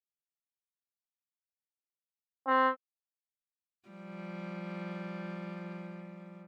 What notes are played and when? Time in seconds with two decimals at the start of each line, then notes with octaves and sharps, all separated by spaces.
2.47 C4
3.88 F3 G3